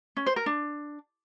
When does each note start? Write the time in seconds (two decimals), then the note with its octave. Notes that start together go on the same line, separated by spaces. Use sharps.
0.17 C#4
0.26 C5
0.36 A#4
0.46 D4